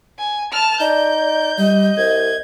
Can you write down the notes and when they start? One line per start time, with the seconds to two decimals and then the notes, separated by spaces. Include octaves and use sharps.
0.18 G#5
0.52 A5 F6
0.81 D#4 D5 G6
1.58 G3 D#5
1.97 C2 G#6